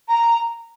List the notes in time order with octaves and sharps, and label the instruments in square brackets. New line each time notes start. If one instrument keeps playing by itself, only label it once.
[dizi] A#5